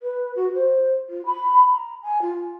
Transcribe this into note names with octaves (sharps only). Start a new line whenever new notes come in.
B4
F#4
C5
F4
B5
A#5
G#5
F4